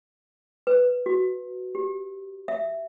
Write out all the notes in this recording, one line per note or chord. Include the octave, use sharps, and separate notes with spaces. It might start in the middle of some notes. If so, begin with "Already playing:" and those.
B4
F#4
G4
E5